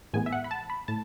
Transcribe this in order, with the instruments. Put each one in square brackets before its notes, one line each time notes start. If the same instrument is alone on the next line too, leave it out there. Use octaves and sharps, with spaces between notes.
[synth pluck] A2 E3 G#3 B3 G#5
E5
F#5
B5
A5
B5
A2 A5